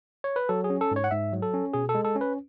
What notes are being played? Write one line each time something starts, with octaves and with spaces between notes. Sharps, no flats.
C#5
B4
F#3 A4
G#4
C#4
A4
G#2 C#5
F#5
G#2 E5
F#3
A4
C#4
B2 G#4
A4
G#3
A4
C#4
B4